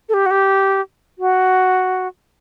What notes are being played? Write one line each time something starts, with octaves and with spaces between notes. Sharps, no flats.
A4
G4
F#4
G4
F#4